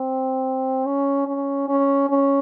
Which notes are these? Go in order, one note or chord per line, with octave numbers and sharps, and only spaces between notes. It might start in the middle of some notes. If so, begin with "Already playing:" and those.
Already playing: C4
C#4
C#4
C#4
C#4